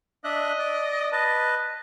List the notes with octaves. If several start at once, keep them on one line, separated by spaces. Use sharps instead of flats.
D4 D#5 E5 F#6
D5
B4 D#5 A5